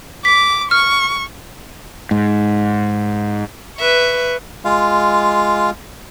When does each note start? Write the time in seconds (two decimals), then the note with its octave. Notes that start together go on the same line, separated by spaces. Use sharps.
0.25 D6 B6
0.71 C#6 F6
2.11 G#2
3.77 B4 E5 C#6
4.65 G#3 F4 F5